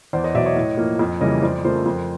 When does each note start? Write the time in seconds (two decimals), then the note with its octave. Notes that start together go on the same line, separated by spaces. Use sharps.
0.13 E2 C5 D5
0.24 C#5 D#5
0.34 B2 F#3 D5 E5
0.46 C#5 D#5
0.56 A2
0.78 F3 A#3
0.99 F2
1.21 C#3 E3 G3 A#3 C#5 D#5
1.42 F2 C5 D5
1.64 C#3 F3 A3 A#4 C5
1.86 F2